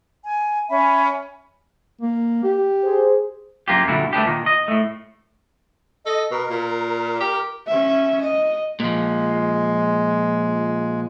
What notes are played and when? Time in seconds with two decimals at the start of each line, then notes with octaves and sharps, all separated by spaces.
0.23 G#5
0.70 C#4 E5 G#5 B5
2.01 A#3
2.43 G4
2.84 G#4 C5
3.68 F#2 A#3 F4 G4
3.88 A#2 D3 F#3 G3 E4
4.13 A3 B3 D4 G4
4.26 A#2 D#3
4.46 D#5
4.68 A2 A3
6.06 A4 D#5
6.31 B2 A#4
6.50 A#2
7.20 G4
7.67 C#4 E5
8.21 D#5
8.80 A#2 F3 G#3